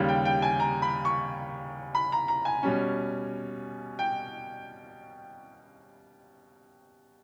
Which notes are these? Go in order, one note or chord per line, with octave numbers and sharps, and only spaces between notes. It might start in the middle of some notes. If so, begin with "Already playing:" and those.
Already playing: D#2 C#3 G3
G5
G5
G#5
A#5
B5
C#6
B5
A#5
A#5
G#5
B2 G3 C#4
G5